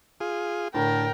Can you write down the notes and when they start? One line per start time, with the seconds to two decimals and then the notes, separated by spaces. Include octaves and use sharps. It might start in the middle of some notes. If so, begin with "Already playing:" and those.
0.20 F4 G#4
0.74 A2 D3 A#4 G5 A5